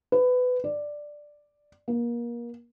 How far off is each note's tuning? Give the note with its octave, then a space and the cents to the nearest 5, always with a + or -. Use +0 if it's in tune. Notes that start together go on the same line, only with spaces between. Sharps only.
B4 +20
D5 +5
A#3 +30